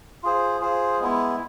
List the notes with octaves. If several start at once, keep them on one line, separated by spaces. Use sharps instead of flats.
F4 G#4 C5
F4 G#4 C5
G#3 B3 E4